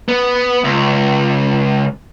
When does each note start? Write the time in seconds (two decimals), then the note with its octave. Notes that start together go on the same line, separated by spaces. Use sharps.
0.08 B3
0.64 C#2